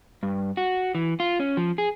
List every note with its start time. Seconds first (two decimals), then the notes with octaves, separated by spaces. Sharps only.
0.23 G2
0.57 F#4
0.95 E3
1.20 F4
1.39 C#4
1.57 F3
1.78 G#4